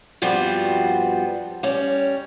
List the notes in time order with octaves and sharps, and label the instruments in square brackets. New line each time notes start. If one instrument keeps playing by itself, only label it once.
[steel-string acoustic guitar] G2 F3 G3 B3 C4 F#4
G3 C#4